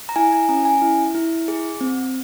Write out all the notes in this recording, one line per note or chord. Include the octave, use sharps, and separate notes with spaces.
A#5
E4 G#5
G#5
C#4 A#5
G#5
E4
E4
G#4
C4